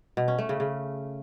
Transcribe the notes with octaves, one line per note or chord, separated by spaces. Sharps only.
B2
C#4
A3
C#3
C#3